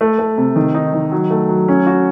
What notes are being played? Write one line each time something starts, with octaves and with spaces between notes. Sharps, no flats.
A3
A3
C3
D#3
D#4
D#3
F#3
A3
F#3
C#4
F#4